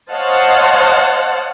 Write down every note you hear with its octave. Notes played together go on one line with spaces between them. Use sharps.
C5 C#5 D#5 F5 F#5 A5